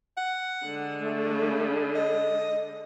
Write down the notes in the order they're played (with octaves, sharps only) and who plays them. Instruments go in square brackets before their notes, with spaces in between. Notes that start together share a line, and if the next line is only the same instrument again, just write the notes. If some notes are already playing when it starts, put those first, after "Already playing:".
[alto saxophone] F#5
[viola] D3 G#3
[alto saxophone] A3
D#5